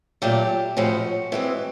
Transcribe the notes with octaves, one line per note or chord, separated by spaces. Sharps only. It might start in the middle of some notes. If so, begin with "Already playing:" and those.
A#2 F#3 A3 G4
A2 F3 G#3 C#4 F#4
E3 G#3 C4